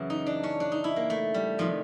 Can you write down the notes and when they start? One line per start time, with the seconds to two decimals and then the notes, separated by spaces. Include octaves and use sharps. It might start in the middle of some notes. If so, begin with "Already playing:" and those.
Already playing: F#2 C#3 E3
0.10 D#4
0.26 D4
0.44 C#4
0.60 D4
0.72 D#4
0.84 E4
0.96 A#3
1.10 A3
1.34 G3
1.59 C3 D#3 F3